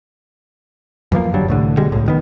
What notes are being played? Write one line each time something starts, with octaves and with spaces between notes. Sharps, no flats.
F#2 E3 F3 A#3
G1 F#3 G3 D4
C2 A2 D3
B2 D3 G3 G#3
C#2 A2
F#1 D#3 B3